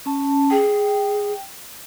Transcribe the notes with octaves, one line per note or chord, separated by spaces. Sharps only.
C#4 A5
G#4 G5